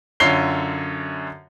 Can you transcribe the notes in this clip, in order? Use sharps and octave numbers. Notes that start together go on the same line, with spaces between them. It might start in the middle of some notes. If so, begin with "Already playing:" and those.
F#2 D3 F4 C#5 C7 G7